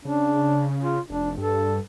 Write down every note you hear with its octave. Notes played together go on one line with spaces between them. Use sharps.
C#3 D4
F4
F1 D4
G2 A4